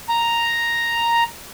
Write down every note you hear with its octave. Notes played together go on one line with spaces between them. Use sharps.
A#5